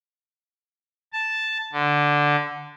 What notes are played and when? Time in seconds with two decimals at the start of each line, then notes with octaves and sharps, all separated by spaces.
1.13 A5
1.72 D3